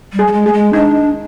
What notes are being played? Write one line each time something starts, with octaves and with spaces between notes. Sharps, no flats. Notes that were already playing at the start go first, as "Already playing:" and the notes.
G3
G#4
G3
G#3
A3 G#4
G#3
D4 D#4